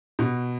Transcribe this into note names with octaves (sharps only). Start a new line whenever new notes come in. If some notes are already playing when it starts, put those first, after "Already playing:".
B2